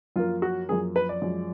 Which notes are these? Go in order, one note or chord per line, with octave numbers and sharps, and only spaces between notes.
F#2 F3 A#3 F4
F#4
F#2 F3 A#3 G#4
B4
D5
F#2 F3 G#3